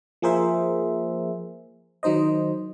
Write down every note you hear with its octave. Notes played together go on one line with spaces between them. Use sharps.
F3 A#3 G#4 A#4 C5 E5
D#3 F#3 D#4 C5 D#5